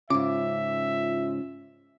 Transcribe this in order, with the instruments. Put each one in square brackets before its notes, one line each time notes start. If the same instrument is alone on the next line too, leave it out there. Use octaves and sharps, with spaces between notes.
[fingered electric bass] G#2 C#3 [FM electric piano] C#4 F4 [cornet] E5 [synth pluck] D6